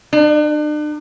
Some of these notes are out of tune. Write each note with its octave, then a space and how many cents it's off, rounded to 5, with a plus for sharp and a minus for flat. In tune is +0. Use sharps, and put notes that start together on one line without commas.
D4 +40